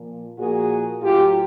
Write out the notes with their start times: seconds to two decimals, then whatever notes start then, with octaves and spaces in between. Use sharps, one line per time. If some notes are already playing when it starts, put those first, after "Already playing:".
Already playing: A#2 F3
0.39 A#2 F3 F#4 G#4
1.02 A2 F#3 F4 G4